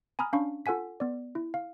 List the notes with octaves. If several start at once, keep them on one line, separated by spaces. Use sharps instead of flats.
G#5 A#5 B5 D#6 F6
C#4 D4 F5 B5 C#6
F4 A4 F#5 G#5 B6
B3 D5
E4
F5